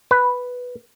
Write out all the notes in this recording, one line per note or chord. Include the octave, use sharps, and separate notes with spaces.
B4